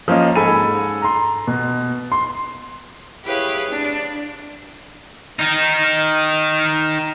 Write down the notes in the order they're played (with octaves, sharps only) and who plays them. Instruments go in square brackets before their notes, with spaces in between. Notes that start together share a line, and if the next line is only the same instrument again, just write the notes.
[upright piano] F3 A#3 C#4 A#4 D#5
G#2 A4 G#5 B5 D#7
A#5 C6
B2
C6
[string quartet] E4 G4 G#4 B4 C#5 F5
D4
[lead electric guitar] D#3 D#4